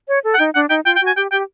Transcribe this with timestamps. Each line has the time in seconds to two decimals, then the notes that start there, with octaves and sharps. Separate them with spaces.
0.08 C#5
0.24 A4
0.34 F#5
0.39 D#4 G5
0.55 D4 F#5
0.69 D#4 G5
0.85 F4 G5
0.96 G5
1.01 F#4
1.07 G#5
1.16 G4 G5
1.32 G4 G5